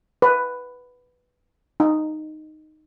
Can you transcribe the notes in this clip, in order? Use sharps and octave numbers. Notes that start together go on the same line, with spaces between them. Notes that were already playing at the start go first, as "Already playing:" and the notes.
B4
D#4